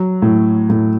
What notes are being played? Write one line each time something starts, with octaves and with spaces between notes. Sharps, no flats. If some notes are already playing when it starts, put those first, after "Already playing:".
Already playing: F#3
A2
A2